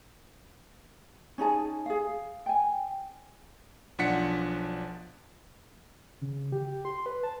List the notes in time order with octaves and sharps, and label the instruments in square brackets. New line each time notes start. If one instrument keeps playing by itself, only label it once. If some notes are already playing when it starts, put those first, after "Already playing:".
[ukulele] C#4 D#4 G#4 A5
G#4 F5
G5 G#5
[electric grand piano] B1 F3 D4 F#5 B6 C#7
[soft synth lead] C#3
G4
G4
C6
B4
A5